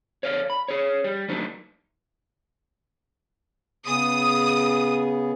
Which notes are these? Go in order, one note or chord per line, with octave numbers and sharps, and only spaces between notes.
C#5 D5 F5
B5
G#4 C#5
G3
F#3 G3 A3 D4 D#4 F#4
C#3 B3 G#4 D#6